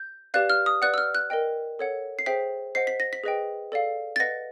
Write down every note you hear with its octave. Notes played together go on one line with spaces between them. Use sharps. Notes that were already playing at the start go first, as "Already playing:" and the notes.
Already playing: G6
G4 B4 D5 F5 F#6
F6
D#6
B4 D5 F#5 F#6
E6
F6
F#6
A#4 D#5 G5
A4 C#5 F#5
C7
G#4 C5 E5 G5 B6
C5 D#5 F#5 C7
B6
A#6
B6
G#4 B4 D#5 G5
A4 D5 F5
A6
B4 D#5 F#5 A#6